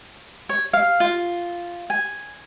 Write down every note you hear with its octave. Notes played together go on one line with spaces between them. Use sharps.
C#5
F5
F4
G#5